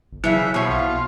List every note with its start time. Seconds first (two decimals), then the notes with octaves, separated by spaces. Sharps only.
0.12 G1
0.24 C#3 E3 F#3 E4 E5
0.54 B2 F3 C#5
0.68 B1 F4